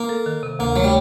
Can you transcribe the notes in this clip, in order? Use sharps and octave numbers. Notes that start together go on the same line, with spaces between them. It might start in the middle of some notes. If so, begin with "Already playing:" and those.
Already playing: A#3
A4
D#3
C3
D2 A#3
F#3 A3
G3